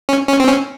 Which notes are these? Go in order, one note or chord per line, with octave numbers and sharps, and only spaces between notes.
C#4
C#4
C4
C#4